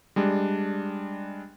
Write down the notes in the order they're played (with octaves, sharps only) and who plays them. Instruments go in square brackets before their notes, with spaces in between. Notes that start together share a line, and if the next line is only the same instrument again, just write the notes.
[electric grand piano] G3 G#3 D4